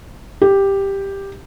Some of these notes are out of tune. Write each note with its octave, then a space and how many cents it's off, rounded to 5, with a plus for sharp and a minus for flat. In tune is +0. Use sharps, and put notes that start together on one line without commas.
G4 +5